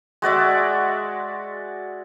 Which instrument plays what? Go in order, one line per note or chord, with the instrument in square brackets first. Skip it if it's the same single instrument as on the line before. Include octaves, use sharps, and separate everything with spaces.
[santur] G#3 F#4 D5 E5